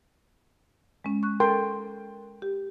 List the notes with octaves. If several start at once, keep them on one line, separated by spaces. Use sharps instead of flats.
G#3 C#4
C#6 F#6
A4 A#4 G5 C6
G4